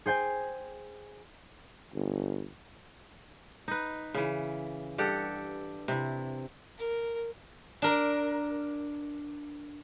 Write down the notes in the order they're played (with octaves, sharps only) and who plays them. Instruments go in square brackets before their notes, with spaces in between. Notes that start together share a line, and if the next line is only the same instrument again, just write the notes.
[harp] G#4 C5 G5 G#5
[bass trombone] G1
[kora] D#4 B4
C#3 E3
G2 G4 A4 F#5
C3 E4
[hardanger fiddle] A#4
[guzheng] D4 A#4